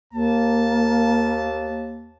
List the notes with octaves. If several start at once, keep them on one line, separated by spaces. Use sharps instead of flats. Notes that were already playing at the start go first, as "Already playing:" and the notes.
D#2 A#3 A5